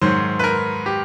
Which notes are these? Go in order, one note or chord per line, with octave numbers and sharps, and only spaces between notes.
G#2 D#3 F#3 C5
B4
A#4
G4